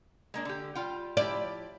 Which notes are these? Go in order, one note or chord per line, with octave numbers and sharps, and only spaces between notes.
G#3 A#3 D4
D3 G4
G3 F4 G5
F3 E4 G4 D5